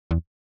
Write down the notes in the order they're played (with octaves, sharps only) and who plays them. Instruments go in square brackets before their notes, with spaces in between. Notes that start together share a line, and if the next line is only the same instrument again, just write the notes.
[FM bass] E2